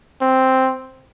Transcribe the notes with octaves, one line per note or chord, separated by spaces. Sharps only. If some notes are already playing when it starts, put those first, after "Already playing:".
C4